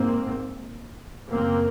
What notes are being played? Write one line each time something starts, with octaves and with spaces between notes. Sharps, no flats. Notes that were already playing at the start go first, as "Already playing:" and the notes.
Already playing: G#2 A#3 C4
F#2 C#3 A#3 C4